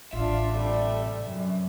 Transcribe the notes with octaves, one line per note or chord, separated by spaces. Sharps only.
A1 D4 F4 E5
C3 G3 A3
F#2